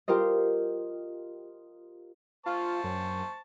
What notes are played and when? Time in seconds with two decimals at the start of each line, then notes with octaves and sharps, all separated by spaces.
0.08 F4 G4 A#4 C5 D#5
2.46 F4 C5 A5 C#6
2.84 F#2